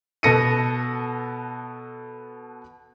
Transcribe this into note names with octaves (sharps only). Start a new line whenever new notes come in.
B2 B3 A4 A#6 C#7 D#7